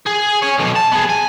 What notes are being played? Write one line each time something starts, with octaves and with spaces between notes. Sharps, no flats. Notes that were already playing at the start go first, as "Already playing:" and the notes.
G#4
C#5 G#5
B1 B2
A5
B3 G#4
G#5